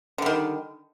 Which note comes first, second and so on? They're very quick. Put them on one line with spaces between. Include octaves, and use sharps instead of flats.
D3 G3 D#3